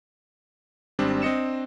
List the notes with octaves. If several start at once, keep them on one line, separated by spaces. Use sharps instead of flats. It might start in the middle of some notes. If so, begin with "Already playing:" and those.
G#1 G3 C4 D4
C4 D4 D#5 C#7 E7